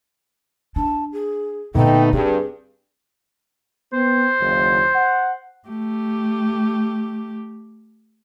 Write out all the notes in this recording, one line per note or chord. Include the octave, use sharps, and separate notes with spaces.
D4 A5
G#4
A#2 D3 A3 B3 D#4 G5
G2 C4 G#4
B3 C4 C5
F#1 D#2
F#5
A3 G4